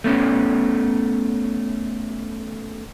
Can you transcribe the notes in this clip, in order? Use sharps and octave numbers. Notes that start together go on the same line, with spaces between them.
A3 B3 C#4